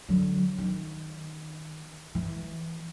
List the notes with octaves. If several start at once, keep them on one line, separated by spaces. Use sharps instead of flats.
D3 F#3
D#3
E3